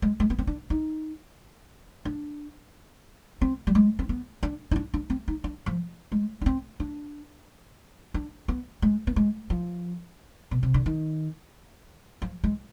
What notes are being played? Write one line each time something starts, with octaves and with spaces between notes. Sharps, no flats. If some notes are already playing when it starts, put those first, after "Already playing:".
G#3
G#3
B3
C4
D4
D#4
D4
C4
G3
G#3
C4
B3
D4
D#4
D4
D4
C4
D#4
D4
F3
G#3
D4
C4
D4
D4
B3
G#3
B3
G#3
F3
B2
C3
D3
D#3
F3
G#3